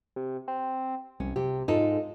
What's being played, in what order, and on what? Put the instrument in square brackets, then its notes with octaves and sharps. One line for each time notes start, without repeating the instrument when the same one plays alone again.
[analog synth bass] C3
C4
[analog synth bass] C2 [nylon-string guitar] C#4
[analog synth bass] C3 [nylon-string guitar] G4
[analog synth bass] G#2 [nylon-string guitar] D#4 F4 A4